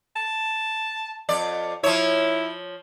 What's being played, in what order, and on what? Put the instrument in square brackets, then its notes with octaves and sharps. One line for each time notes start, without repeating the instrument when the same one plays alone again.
[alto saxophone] A5
[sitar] F2 D5
[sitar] F3 C#5 [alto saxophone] E4